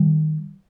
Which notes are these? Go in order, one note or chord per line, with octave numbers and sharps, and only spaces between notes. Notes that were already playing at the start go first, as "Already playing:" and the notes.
Already playing: D#3 G3